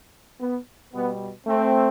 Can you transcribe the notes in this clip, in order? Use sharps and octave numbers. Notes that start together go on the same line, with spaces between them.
B3
B2 G3 B3
A3 C4